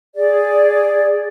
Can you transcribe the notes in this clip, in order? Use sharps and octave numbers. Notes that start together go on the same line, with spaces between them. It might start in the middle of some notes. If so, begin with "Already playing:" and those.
G#4 D5